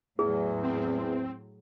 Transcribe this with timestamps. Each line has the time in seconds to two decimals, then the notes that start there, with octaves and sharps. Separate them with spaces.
0.19 E2 A2 F#3 G#4
0.63 C4